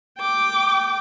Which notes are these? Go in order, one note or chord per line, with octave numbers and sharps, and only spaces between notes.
G5 D6